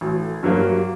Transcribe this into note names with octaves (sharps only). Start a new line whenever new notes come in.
A1 F#4
A4
G2 F#3 A#3 G4
G4
F#4